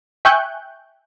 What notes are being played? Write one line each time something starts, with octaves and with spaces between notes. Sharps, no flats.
E5 G5 G#5 C#6 F#6 G6